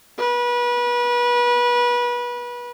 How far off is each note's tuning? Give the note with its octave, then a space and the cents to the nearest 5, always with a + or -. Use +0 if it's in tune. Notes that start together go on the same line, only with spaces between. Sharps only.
B4 -30